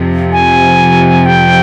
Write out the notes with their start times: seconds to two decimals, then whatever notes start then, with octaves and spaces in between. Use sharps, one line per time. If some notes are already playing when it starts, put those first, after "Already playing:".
Already playing: F2 C3 F3
0.32 G#5
1.26 G5